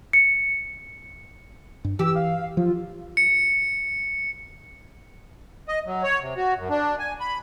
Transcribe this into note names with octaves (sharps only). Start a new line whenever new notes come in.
C#7
G2
E3 G4 E6
F5
F3 F4
C#7
D#5
F#3
C#5
C3
F#4
F#2
D4
G#5
B5